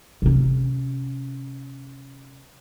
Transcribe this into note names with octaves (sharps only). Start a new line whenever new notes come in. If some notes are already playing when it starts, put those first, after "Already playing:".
C3 C#4